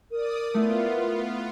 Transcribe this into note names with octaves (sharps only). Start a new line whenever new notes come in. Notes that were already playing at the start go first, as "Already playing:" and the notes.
A#4 D5 D#6
A3 B3 E4 F4